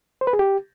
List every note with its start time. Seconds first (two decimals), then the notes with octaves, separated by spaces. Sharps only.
0.21 C5
0.27 B4
0.33 G#4
0.39 G4